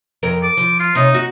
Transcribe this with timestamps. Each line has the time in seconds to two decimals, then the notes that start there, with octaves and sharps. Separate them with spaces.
0.23 F2 A#4
0.43 D6
0.57 F3
0.80 F4
0.95 C3 D#4 C#5
1.14 F#4